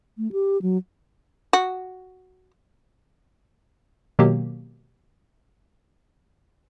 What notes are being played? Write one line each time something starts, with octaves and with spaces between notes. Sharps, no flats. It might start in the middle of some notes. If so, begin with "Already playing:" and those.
A3
G4
F#3
F#4
B2 D#3 F#3 A#3 G4